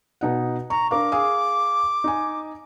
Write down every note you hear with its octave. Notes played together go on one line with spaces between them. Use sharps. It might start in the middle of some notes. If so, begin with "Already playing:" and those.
B2 D#4 F#5
A#5 C#6
D4 A#4 F5 D6
G#4 F5 D#6
D#4 G#5